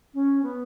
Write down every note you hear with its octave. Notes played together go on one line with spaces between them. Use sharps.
C#4
B3